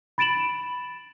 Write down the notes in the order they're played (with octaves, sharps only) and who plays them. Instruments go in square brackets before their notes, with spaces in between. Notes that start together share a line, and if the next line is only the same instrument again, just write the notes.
[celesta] B5 A6 D7 E7 F#7